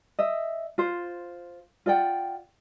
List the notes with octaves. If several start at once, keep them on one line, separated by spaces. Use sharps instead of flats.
D#5 E5
F4 C5
F4 D5 F#5 G5